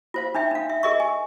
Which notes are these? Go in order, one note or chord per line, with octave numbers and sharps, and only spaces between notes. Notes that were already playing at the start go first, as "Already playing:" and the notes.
F4 C5 F5
D4 D#4 E5 G5
D4 F5
E5
G#4 A#4 D#5 E5 C#6
G#5